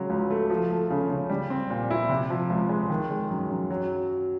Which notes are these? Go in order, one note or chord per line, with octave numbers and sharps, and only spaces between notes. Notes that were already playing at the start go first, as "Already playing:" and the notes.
Already playing: C#3 F#3 G#3
C#2
A3
F3
A3
C#3
C#3
G3
C4
A#2
E4
C3
F3
C#2
G#3
D#3
G#3
F#2
F#2
F#3